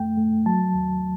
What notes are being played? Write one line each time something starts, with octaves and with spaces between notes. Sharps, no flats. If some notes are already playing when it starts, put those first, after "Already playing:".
Already playing: F#2 A3 G5
A3
F#3 A5
D#2